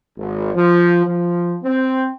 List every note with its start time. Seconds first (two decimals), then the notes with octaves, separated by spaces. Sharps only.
0.18 G#1
0.54 F3
1.05 F3
1.64 C4